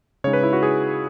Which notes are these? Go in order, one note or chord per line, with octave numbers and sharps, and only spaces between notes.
C#3 G#3 D#4 C#5
B4
E4
F#4
G#4